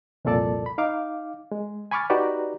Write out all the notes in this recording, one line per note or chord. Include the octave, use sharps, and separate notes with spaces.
C2 F2 A#2 A4 D5 A5
B5
D#4 F5 D6
G#3
G#5 B5 C#6 D6 F6 A6
D#4 F#4 G4 B4 D5 A#5